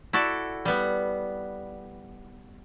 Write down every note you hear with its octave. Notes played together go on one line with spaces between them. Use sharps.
E4 F#4 A4 D5
G3 B3